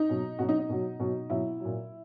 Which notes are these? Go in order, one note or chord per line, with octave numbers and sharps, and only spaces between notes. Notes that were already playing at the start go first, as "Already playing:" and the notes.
Already playing: D#4
B2 F#3
B2 F#3 F#4
D#4
D#4
B2 F#3
B2 F#3
B2 F#3 E4
A#2 F#3